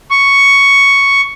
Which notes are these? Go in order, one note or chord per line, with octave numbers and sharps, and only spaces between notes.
C#6